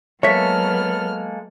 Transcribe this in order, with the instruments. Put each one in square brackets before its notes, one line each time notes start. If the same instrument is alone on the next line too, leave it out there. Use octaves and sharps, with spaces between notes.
[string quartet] F#3 B3 F6 [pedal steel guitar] G#3 A#3 A4 [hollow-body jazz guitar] C#5 E5